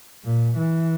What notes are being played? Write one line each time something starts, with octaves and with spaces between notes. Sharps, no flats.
A#2
E3